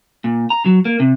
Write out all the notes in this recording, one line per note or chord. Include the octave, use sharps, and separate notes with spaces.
A#2
A#5
F#3
A#3
C3